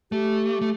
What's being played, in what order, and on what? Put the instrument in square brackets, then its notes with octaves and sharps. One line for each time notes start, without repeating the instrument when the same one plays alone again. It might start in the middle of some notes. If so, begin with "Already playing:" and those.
[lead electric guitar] A3 [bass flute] G4
[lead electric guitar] A3